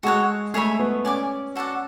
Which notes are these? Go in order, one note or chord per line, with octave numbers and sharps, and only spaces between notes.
G#3 F#4 A4 C#5 F#5
A3 G#4 C#5 E5 B5
B3
C#4 D5 G#5 D6
F#4 A4 D5 F#5